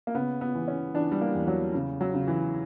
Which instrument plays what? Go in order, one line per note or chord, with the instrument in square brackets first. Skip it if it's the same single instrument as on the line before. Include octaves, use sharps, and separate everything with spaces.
[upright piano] A#3
C#3 B3
B3
E3
C#4
E3 D4
G3
A#3
E2
F#3
C#3
F#3
C#3
E3